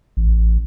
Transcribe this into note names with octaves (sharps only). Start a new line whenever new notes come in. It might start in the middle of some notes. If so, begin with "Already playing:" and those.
A1